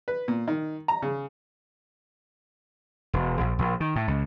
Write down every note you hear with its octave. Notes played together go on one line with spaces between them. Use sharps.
B4
A#2
D#3
A#5
C#3
E1
A#1
A#1
D#3
A2
C#2